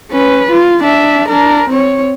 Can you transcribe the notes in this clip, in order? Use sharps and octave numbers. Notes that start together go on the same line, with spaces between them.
C#4 B4
F4
D4 E5
D4 A#4
C4 C#5